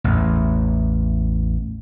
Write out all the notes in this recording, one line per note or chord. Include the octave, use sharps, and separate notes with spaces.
A1 E2